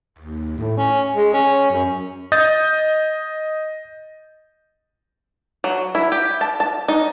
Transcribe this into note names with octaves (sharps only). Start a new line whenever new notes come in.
D#2
A2
C#4
G#3
C#4
F#2
D#5 D#6 G6 A6
F#3
E4
G4
A5
A5
D#4